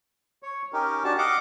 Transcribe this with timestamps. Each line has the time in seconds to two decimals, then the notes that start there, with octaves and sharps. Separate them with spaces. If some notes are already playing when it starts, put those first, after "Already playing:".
0.43 C#5
0.73 C#4 D#4 G4 A#4
1.04 D4 F#4 G4 A5
1.18 D#5 F5 F#5 D6